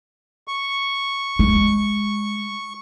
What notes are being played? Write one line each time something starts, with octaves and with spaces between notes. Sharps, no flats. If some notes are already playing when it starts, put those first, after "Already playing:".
C#6
G#3